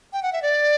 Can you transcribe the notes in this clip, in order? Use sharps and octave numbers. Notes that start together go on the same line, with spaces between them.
G5
F#5
E5
D5